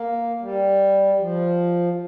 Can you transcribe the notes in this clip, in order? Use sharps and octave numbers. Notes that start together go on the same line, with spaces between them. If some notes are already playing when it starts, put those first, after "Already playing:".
Already playing: A#3
G3
F3